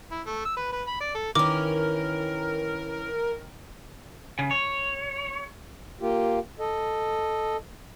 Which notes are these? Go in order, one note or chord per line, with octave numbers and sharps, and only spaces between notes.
E4
A3
E6
B4
B4
B5
D5
A4
D#3 E3 C#4 A#4 D6
C#3
C#5
A#3 F4 G4
A4 D#5